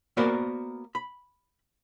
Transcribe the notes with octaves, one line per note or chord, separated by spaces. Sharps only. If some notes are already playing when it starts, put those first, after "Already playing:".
A#3 B3 F#4 A#4 C5 D5
B5